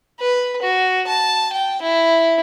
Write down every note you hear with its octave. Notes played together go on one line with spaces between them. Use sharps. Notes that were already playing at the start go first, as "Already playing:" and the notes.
B4
F#4
A5
G5
E4